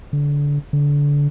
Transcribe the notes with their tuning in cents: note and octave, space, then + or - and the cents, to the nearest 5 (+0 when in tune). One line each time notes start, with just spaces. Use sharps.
D3 -25
D3 -25